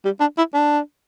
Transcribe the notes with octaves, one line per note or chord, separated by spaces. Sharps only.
G3
D4
E4
D4